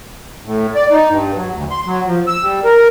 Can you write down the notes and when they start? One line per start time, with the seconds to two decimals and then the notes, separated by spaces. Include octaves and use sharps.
0.46 A2
0.75 D5
0.91 D#4
1.10 G2
1.36 F#3
1.54 D2
1.71 C6
1.86 F#3
2.06 F3
2.27 E6
2.42 G3
2.64 A#4